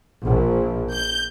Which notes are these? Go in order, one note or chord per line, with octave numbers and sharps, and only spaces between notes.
A#1
G6